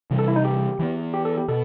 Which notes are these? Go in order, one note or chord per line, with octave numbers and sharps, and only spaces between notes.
C3 E3 G3
A4
E4
D#4
G4
E3 B3
G4
A4
G4
B2 A4